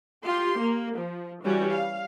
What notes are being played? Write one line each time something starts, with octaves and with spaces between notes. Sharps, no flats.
F4 G4 C6
A#3
F3
E3 G3 C#4 F#4
F5